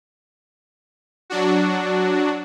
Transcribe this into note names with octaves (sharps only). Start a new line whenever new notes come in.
F#3 D4 F#4